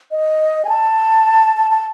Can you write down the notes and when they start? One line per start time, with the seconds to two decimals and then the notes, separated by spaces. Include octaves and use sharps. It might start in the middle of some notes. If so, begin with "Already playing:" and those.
0.11 D#5
0.65 G#5
0.69 A5
1.56 A5
1.71 A5